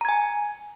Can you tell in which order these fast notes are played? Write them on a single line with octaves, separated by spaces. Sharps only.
A#5 G#6 G#5